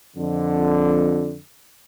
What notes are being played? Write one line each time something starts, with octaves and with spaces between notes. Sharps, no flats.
F2 D3